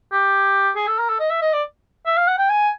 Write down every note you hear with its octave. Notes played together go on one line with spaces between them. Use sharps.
G4
G#4
A4
A#4
A4
D#5
E5
D#5
D5
E5
F5
F#5
G5
G#5